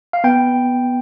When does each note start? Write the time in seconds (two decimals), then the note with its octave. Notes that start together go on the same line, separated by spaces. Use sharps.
0.13 F5
0.24 B3 G5